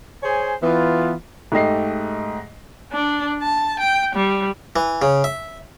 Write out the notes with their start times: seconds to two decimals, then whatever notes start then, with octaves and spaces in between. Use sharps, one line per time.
0.23 G#4 C5 C#5 G#5
0.62 E3 B3 F4
1.52 G#2 A3 G4 D#5 C7
2.92 D4
3.42 A5
3.79 G5
4.15 G3
4.76 E3
5.02 C#3
5.24 E5